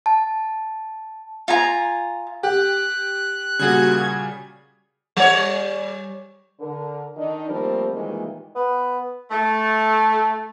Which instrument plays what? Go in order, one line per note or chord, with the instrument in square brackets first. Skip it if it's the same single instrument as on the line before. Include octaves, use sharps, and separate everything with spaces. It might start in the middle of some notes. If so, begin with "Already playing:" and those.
[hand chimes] A5
[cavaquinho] F4 G#5 A#5
[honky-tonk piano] G4 [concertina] F#6
[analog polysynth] A#2 F#4 G#6 [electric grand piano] C#3 G3 G#4
[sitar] G3 C#5
[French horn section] D3 A#4
D#3 D4 D#4
F3 G3 A3 A#3 C4 A#4
A#2 D#3 E3 G3 G#3 A#3
[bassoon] B3
[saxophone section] A3